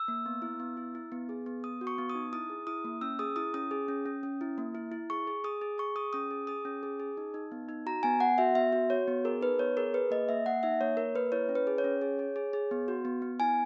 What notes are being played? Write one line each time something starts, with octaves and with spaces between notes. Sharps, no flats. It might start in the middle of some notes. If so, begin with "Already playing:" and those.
Already playing: E6
A#3
B3
E4
B3
E4
E4
B3
G#4
B3
B3 D#6
F#4
C#6
B3
D#6
D#4
E4 D#6
G#4
E4 D#6
A#3
C#4 E6
G#4 D#6
E4 D#6
C#4 D#6
G#4
C#4
C#4
C#4
E4
A#3
E4
E4
G#4 C#6
G#4
G#4 D#6
G#4
G#4 C#6
G#4 D#6
C#4 D#6
G#4
G#4 D#6
C#4
G#4
G#4
D#4
D#4
B3
D#4
F#4 A#5
B3 G#5
B3 F#5
F#4 E5
B3 E5
F#4
F#4 C#5
B3
G#4 A#4
D#4 B4
B3 C#5
G#4 A#4
G#4 B4
A#3 D#5
A#3 E5
A#3 F#5
D#4 E5
A#3 C#5
A#3 A#4
A#3 B4
E4 C#5
C#4
B4
G#4
C#5
C#4
G#4
G#4
G#4
G#4
B3
F#4
B3
B3
E4 G#5